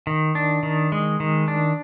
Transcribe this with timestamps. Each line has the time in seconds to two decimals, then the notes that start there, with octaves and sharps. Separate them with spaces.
0.07 D#3
0.35 D4
0.63 D#3
0.92 G#3
1.20 D#3
1.48 D4